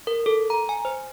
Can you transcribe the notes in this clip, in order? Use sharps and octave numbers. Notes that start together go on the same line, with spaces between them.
A#4
A4
A#5
G#5
C5